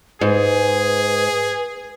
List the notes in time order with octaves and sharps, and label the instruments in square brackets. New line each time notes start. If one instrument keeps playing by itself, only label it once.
[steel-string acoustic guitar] G#2 [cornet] G#4 [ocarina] B4